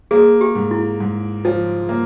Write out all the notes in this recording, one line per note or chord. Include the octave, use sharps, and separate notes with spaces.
A#3 G#4
G4
G#2
E4
G#2
F3
A#3